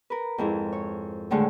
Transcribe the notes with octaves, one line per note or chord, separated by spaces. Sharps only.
A#4 B4
F2 G#2 E4
C#5
D#2 A2 D3 G#3 A3